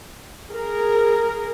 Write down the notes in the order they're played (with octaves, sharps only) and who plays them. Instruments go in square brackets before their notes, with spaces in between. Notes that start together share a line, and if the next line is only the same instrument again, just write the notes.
[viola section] G#4 A#4